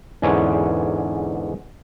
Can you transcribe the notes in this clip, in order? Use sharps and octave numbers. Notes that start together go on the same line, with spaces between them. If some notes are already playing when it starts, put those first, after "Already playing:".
E2 G#2 D3 C#4 B4 C#5